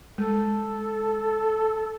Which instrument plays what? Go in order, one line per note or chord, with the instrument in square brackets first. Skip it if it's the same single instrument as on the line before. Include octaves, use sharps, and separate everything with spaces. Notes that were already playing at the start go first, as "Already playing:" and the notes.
[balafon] G#3 [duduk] A4